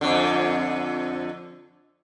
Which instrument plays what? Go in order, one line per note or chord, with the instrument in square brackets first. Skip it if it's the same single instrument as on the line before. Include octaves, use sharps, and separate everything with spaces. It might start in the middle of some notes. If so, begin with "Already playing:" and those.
[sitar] F2 D3